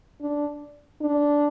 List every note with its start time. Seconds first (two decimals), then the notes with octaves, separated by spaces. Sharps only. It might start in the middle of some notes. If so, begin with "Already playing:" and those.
0.21 D4
1.01 D4